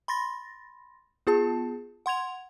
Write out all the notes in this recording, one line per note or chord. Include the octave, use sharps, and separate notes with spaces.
B5 C6 A6 A#6
B3 F4 G#4 A5
F#5 C6 G#6 F7